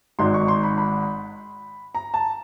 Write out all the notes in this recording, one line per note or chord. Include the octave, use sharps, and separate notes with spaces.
G#1 G#2 D#3 C6
C#6
C6
B5
B5
A#5
A5